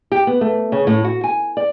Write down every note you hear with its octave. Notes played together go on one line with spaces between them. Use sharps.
G4
B3
A3
C#3
A2
F#4
G#5
D5